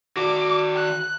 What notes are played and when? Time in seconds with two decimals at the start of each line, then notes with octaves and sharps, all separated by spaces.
0.17 D#3 F#4 D6
0.76 F#6